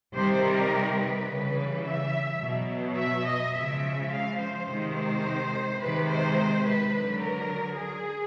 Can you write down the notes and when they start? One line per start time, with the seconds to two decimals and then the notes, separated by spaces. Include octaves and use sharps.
0.15 C3 D#3 G3 C5
0.44 A#4
1.00 B4
1.28 C#3 E3 G3
1.85 E5
2.42 B2 F#3
2.98 E5
3.26 D#5
3.55 C#3 F3 G#3 E5
4.11 F5
4.39 C5
4.68 C3 D#3 G#3
4.96 C5
5.81 C3 D#3 G#3 B4
6.09 C5
6.66 B4
6.94 D3 F#3
7.22 A#4
7.79 G#4